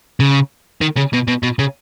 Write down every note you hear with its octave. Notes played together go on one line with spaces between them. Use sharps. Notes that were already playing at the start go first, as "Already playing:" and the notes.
C#3
D#3
C#3
B2
B2
B2
C#3